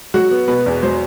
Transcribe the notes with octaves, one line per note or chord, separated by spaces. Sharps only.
F#3 F#4
B3
B2 B4
E2
F#3 C5